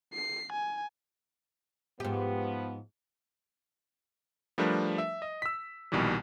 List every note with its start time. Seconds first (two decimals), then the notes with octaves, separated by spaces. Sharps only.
0.14 C7
0.52 G#5
2.00 G#2 F3 B3 G4
4.58 F3 G3 A3 D4 A#4 B4
4.98 E5
5.22 D#5
5.42 E6 B6
5.92 A#1 B2 D#3 E3 G3